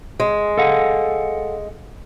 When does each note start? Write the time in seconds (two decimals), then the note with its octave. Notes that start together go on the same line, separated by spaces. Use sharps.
0.20 G#3
0.58 A4 F5 F#5